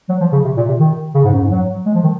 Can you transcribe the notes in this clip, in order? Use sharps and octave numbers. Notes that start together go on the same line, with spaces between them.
F#3
F3
C#3
C3
A#2
C3
D#3
C#3
G#2
F#2
G#2
F#3
G#3
F3
D#3